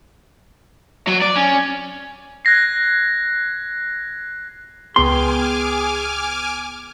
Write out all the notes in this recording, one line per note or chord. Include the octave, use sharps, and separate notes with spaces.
F#3
D5
C#4
F#6 G#6 A#6 C7
C#2 B3 G#4 G5 G#5 C6 D6 F6